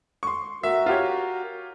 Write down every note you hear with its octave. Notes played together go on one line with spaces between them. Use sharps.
C6 C#6
F#4 A#4 E5
F4 G4 C#5